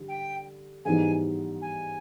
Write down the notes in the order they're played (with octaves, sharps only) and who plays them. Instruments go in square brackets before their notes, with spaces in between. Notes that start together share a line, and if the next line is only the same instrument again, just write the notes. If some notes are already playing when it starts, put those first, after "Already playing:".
Already playing: [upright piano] D3 G3
[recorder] G5
[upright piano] G#2 E3 G3 B3 D#4 [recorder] G#5
[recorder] G#5